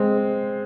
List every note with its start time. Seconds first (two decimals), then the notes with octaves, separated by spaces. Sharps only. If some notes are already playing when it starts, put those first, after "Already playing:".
Already playing: G#3 C4